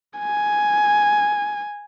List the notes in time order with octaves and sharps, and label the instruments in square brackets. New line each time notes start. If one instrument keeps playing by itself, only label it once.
[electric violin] G#5